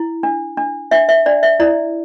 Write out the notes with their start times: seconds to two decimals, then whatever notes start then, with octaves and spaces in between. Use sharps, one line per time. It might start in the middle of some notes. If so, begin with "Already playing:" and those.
Already playing: E4
0.23 D4
0.57 D4
0.91 D4 E5
1.09 E5
1.26 D4 D5
1.43 E5
1.60 E4 D5